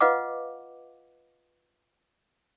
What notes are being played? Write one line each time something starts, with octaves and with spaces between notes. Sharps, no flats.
F4 B4 D#5 F5 F#5 D6